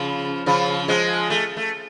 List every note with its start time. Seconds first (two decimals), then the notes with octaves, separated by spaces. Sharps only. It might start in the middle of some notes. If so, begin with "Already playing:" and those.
Already playing: C#3 F3
0.46 C#3 F3
0.88 F3 G#3
1.30 A3
1.57 A3